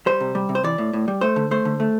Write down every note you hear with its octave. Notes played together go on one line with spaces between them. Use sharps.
G3 C5
C3
G3
C3
C5
E3 D5
A2
A2
G3
A3 C5
D3
A3 C5
D3
A3